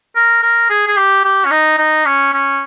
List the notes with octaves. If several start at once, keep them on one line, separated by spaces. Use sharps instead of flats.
A#4
A#4
G#4
G#4
G4
G4
C#4
D#4
D#4
C#4
C#4